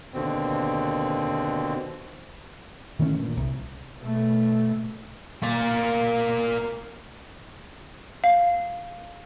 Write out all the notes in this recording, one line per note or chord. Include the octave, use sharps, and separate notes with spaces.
D#2 B2 D3 C4
D#3 E3 A3 C#4
G2 A#2
C2
B2 A3
A#3 D5
F5